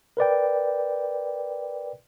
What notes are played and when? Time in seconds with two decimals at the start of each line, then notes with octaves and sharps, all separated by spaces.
0.17 A#4 B4 D5 G5